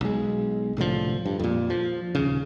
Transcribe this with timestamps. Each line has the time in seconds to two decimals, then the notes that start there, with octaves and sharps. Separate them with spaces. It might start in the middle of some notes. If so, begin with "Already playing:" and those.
0.01 B1 G#3
0.77 C2 A2 D3 F3
1.26 G2
1.39 F2 A#2
1.70 F3
2.15 D#1 C#3